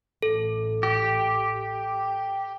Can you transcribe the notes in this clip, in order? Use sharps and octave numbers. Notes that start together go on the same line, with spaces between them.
A1 A2 A4
G4